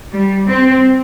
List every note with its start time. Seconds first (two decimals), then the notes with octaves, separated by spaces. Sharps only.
0.13 G3
0.49 C4